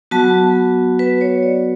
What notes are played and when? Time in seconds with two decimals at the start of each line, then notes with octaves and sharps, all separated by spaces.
0.11 F#3 B3 F#4 A5
0.99 B4
1.21 C#5
1.43 D5